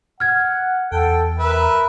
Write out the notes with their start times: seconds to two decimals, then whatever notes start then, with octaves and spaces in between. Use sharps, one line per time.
0.20 F#5 F6 G#6
0.92 E2 A4 G5
1.39 A#4 B4 E5